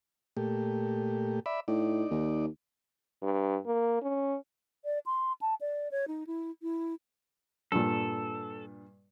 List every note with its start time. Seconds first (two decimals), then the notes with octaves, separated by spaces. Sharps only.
0.37 A#2 A3 G4
1.46 D5 E5 B5
1.68 A2 D#4 D5
2.11 D#2
3.23 G2
3.66 A#3
4.02 C#4
4.85 D5
5.06 C6
5.41 A5
5.61 D5
5.91 C#5
6.08 D#4
6.27 E4
6.62 E4
7.72 G2 A#2 A4